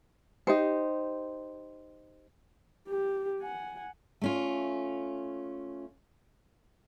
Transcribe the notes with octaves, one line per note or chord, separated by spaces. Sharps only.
D#4 G4 C5
G4
F#5 G#5
A3 C#4 F4